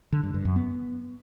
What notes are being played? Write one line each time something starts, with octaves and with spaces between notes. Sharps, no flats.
D3
G2
G2
F#2
B3